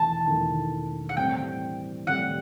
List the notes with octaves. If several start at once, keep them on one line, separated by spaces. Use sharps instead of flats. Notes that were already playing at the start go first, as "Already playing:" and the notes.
Already playing: E1 E2 D#3 A3 A5
E1 E2 D#3 A3
F#5
A2 G3 C4 G5
A2 G3 C4 F#5